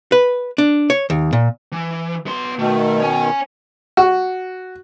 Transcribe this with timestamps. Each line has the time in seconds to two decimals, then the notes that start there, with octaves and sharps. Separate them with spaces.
0.12 B4
0.58 D4
0.90 C#5
1.10 D#2
1.33 A#2
1.72 E3
2.27 B3 C6
2.59 B2 D#3 A3
3.00 C#5 G#5
3.97 F#4